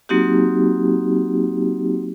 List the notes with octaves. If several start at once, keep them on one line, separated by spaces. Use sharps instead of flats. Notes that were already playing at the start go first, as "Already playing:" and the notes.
F#3 A#3 C4 D#4 F#4 G4